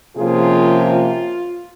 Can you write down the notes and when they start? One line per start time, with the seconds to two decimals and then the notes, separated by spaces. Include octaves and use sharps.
0.16 C3 F3 A#3 C#4 F4 G#4
0.82 F4